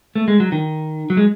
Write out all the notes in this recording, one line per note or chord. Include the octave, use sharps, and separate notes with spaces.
A3
G#3
F#3
D#3
F#3
G#3